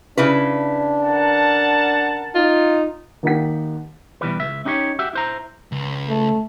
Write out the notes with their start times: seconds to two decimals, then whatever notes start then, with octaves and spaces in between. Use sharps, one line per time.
0.17 C#3 D4 E4 B4
1.02 A#4 F#5 A5
2.35 D#4 F4
3.23 D#2 A#3 D#4 G4 F#5 B6
4.21 B2 E3 G3 B4
4.40 C#2 E5
4.65 C#4 D#4 G4 B4 C#5
4.99 F#4 G4 E5
5.13 E4 C5 A#5
5.72 C#2
6.08 A3